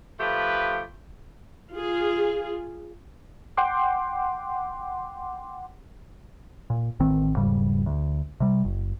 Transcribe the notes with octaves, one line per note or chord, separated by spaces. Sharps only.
F3 A3 G4 B4
F4 G#4
F#5 G5 C6 D6
A#2
A1 D#3 C4
E1 G#2 C#3 G3
D2
C3 G3
F#1